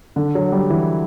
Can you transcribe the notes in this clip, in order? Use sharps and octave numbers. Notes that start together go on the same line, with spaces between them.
D3
F#3
G3
E3